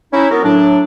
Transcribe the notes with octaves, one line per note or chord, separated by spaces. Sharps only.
C#4 D#4 E4
F#3 B3 A#4
A2 F#3 D4